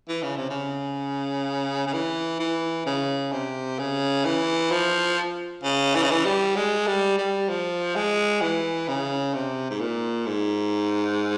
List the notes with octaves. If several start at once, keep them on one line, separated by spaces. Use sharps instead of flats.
E3
C#3
C3
C#3
C#3
E3
E3
C#3
C3
C#3
E3
F3
C#3
E3
C#3
E3
G3
G#3
G3
G3
F3
G#3
E3
C#3
C3
G#2
A#2
G#2